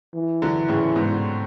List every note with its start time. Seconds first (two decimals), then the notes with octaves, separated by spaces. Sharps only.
0.15 E3
0.42 D3 F#3
0.68 A2 C#3
0.96 G#2 B2